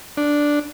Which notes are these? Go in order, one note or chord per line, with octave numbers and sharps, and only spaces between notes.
D4